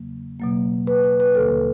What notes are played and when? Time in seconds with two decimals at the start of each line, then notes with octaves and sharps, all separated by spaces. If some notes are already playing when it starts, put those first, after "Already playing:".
Already playing: E2 C#3 F#3 A#3
0.39 B2 F#3 A#3
0.87 B4
1.04 B4
1.20 B4
1.35 D#2 D3 G3 A#3 A4